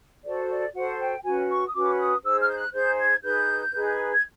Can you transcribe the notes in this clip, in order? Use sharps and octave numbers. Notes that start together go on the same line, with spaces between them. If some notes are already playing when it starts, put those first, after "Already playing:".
F#4 A4 C5 D5
D5
F#4 A4 C5 F#5
G5
C#4 F#4 B4 G#5
C#6
D#6
C#4 F#4 B4 D6
D#6
D#4 G#4 C5 E6
F6
G6
F#6
D#4 G#4 C5 G6
G#6
D#4 G#4 B4 G6
D#4 G#4 B4
G#6